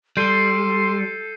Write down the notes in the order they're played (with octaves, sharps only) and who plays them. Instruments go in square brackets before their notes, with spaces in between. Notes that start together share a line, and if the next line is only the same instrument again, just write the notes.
[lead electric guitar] G3 [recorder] A4 [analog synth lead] C6 [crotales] G6 C7 D#7